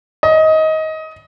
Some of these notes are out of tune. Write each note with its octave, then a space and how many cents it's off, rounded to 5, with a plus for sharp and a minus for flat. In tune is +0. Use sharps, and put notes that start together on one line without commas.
D#5 +20